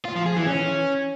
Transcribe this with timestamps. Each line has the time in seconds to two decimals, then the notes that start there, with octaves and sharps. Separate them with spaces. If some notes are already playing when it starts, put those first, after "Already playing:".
0.05 F4
0.16 F3
0.26 G#4
0.36 E3
0.46 C#4